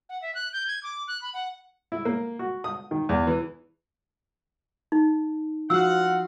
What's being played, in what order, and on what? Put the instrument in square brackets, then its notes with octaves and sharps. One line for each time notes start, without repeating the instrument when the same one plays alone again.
[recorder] F#5
E5
F#6
G6
G#6
D6
F#6
B5
F#5
[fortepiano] E4
A#3
F#4
D#6
D#3
E2
E3
[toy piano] D#4
[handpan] F3 F4 F#4 [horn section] F5 F#5 [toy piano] E6